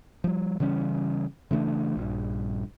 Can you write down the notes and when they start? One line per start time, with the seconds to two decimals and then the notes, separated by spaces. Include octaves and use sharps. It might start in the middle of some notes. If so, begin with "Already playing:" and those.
0.24 F3 G3
0.60 C#3 E3 G3 C#4
1.51 C#3 E3 A3 D4
1.97 A#1 G2